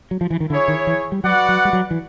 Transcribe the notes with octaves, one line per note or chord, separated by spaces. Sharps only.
F#3
F3
E3
D#3
D3 E4 G#4 C#5
D#3
E3
G3
F#3 F#4 B4 D5 F#5
F#3
G3
F#3
E3